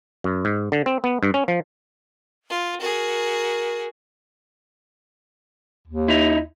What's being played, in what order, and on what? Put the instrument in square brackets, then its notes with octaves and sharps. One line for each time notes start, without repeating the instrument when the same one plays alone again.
[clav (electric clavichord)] F#2
G#2
D3
C4
B3
G2
C#4
F3
[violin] F4
[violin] F#4 G#4 [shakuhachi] A#4
[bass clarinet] D#2
[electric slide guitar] D#4 E4